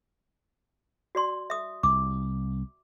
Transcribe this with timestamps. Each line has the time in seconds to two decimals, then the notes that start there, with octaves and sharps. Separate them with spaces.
1.15 F#4 D5 C6
1.50 E5 D#6
1.83 C2 D6